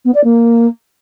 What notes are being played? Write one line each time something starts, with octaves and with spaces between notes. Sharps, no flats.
B3
D5
A#3